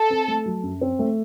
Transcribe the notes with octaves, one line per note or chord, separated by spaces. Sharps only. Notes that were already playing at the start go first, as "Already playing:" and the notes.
Already playing: A4
C4
A3
F#3
F#2
C4
A3